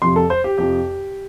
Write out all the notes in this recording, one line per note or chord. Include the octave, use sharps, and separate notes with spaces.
F2 C3 F3 C6
A4
C5
G4
F2 C3 F3 G4